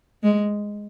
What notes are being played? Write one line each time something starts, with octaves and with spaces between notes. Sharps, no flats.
G#3